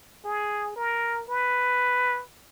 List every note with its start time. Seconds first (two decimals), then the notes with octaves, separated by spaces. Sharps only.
0.24 G#4
0.76 A#4
1.28 B4